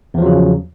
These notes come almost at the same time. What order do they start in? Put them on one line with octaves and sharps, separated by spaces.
E2 F3 F#3 C#3